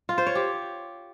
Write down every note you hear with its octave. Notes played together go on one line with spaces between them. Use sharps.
F4
C5
C#5
G4